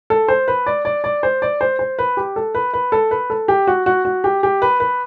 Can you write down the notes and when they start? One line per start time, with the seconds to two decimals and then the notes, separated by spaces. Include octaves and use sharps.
0.10 A4
0.28 C5
0.48 B4
0.66 D5
0.85 D5
1.04 D5
1.23 C5
1.42 D5
1.61 C5
1.79 C5
1.99 B4
2.17 G4
2.36 A4
2.55 B4
2.74 B4
2.92 A4
3.11 B4
3.30 A4
3.48 G4
3.67 F#4
3.86 F#4
4.05 F#4
4.24 G4
4.43 G4
4.62 B4
4.80 B4